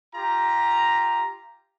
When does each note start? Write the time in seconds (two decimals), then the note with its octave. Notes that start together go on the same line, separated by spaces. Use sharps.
0.15 F4 G4 A#5